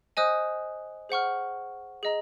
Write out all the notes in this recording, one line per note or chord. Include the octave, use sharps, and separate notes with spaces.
C5 D#5 G#5 D#6 F#6
G#4 C5 F#5 C#6 F6
G#4 D#5 A#5